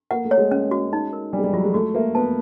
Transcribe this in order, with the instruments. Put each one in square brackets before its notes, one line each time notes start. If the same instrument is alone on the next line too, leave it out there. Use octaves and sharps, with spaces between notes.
[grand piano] A#3 [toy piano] F#5
[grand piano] A3
[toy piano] C#5
[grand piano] G#3
[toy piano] C#4
F#4
D#4
A#4
[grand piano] G3 [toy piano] D4
[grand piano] G#3
G3
[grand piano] F#3 [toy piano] F4
[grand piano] G#3
[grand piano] A3 [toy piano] F#4
[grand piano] A#3 [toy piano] E5
[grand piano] B3 [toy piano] A5